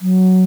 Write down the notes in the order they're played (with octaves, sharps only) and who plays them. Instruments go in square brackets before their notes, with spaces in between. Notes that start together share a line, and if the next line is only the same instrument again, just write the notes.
[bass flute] F#3